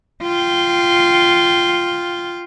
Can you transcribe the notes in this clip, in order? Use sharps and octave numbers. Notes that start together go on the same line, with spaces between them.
F4 G5